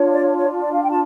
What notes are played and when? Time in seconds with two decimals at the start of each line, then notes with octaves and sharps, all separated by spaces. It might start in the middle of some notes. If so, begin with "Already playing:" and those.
Already playing: D4 F4 C#5
0.13 D5
0.38 C#5
0.62 D5
0.74 F5
0.83 G5
0.90 A5